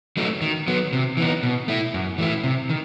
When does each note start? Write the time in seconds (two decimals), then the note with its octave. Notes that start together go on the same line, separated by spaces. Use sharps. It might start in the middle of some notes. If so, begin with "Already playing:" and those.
0.17 F#3 A3 D#4
0.42 D#3
0.68 F#3 B3
0.93 C3
1.17 E3 B3 D#4
1.43 B2
1.68 A3 E4
1.94 F#2
2.18 E3 A3 E4
2.44 C3
2.69 D#3